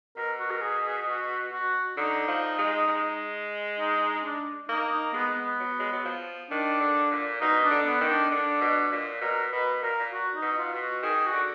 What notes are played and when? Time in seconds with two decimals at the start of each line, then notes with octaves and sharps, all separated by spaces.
0.17 B2 A#4
0.39 F#4
0.51 A#4
0.62 G#4
0.84 G#4
1.07 F#4
1.52 F#4
1.97 D3 D#4
2.28 F3
2.58 G#3
2.88 G#3
3.79 D#4
4.01 D#4
4.24 D4
4.69 A#3 D#4
4.92 D#4
5.14 G#3 B3
5.37 B3
5.60 F#3
5.80 G#3
5.93 F#3
6.05 F3
6.51 D#3 D4
6.80 D3
7.11 A#2
7.41 B2 D#4
7.63 D4
7.71 D3
7.86 B3
8.01 D#3
8.09 D4
8.31 D3 D4
8.61 B2
8.92 A#2
9.21 B2 A#4
9.52 B2 B4
9.83 A#2 A#4
10.00 A#2
10.13 F#4
10.35 D#4
10.42 B2
10.58 F4
10.73 B2
10.80 F#4
11.03 D#3 G#4
11.20 G#4
11.26 F#4
11.33 D3